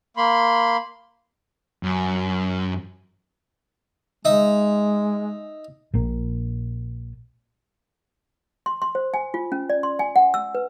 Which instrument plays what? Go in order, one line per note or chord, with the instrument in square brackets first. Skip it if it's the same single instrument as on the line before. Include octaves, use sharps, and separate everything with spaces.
[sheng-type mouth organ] A#3 B5 C6
[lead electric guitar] F#2
[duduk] G#3 [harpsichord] D#4 E5
[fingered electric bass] A#1 A#2
[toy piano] C6
C6
C5
G#5
F4
C#4
D5
C6
G#5
F#5
E6
B4